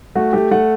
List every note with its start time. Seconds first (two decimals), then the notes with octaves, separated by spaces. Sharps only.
0.15 A3 F#4
0.33 A3 G4
0.51 A3 F#5